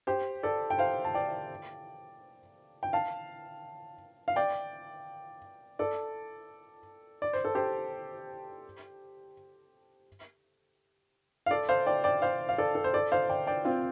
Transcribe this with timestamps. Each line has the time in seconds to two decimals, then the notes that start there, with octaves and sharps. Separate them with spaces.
0.07 G4 C5
0.43 A4 D5
0.70 G5
0.78 C5 F5
1.05 A5
1.14 D5 G5
2.83 G5
2.93 F5 A5
4.28 F5
4.36 D5 G5
5.79 A4 D5
7.22 D5
7.33 C5
7.45 A4
7.55 G4 C5
11.46 F5
11.51 A4 D5
11.69 C5 F5
11.87 D5 G5
12.04 D5 G5
12.22 C5 F5
12.49 F5
12.58 A4 D5
12.75 A4
12.84 C5
12.94 A4 D5
13.12 C5 F5
13.29 D5 G5
13.47 D5 G5
13.65 C4 F4